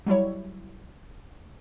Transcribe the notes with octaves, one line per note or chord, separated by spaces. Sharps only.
F#3 G3 E4 C#5